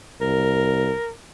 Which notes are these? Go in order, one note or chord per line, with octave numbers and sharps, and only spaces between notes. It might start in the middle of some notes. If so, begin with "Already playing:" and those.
C2 A#4